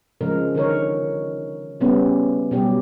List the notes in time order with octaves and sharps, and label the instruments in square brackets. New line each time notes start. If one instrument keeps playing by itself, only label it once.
[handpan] C#3 F3 G#3 A#4
D3 D#3 A#4 C#5
C#3 G3 A3 B3 C#4
B2 F#3 G3 G4